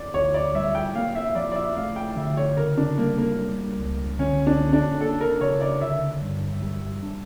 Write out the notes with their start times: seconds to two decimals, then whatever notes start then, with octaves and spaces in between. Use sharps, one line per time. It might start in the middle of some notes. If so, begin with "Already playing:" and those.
Already playing: D5
0.14 D2 C#5
0.34 D5
0.54 G3 E5
0.75 G5
0.95 A#3 F5
1.15 E5
1.35 F3 D5
1.52 D5
1.56 E5
1.76 A3 F5
1.96 G5
2.17 D3 E5
2.37 C#5
2.57 C#3 A#4
2.77 D4
2.98 G3 A#3
3.18 A#3
3.38 G3
3.78 C#2
4.19 D3 C#4
4.47 D4
4.60 A#3
4.73 D4
5.01 A#3 A4
5.21 A#4
5.41 C#3 C#5
5.61 D5
5.81 D3 E5
6.22 G2
6.62 G3
7.03 D4